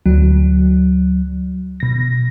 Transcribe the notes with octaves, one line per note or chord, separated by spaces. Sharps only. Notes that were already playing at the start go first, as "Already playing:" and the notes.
D2 F#3
B2 A#6